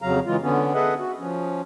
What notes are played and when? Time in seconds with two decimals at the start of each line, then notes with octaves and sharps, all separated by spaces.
0.02 F2 C#3 F#3 F5 A#5
0.26 C#3 E3 G#3 F4
0.42 D3 B3 C#4
0.74 G#4 A4 B4 D#5 E5 F#5
0.99 F#4
1.19 F3 C#4